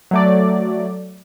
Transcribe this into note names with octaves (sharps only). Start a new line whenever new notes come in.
F#3 A3 D5